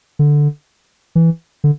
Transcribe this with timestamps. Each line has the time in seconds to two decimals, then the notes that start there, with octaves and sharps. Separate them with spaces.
0.19 D3
1.15 E3
1.64 D3